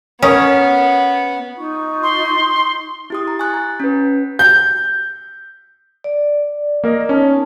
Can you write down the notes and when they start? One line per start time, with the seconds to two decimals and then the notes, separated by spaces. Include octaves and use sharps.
0.22 B3 C#4 A#4 C#5 D#6
1.55 D#4 F4 C#6
2.03 C6
3.10 E4 G4 D#6
3.28 A#5
3.39 G#5 C#6 F#6 A6
3.54 A#5
3.80 C#4 B4
4.39 G6
6.04 D5
6.84 A#3 A#4 D#5
7.09 B3 C#4 D#4 A5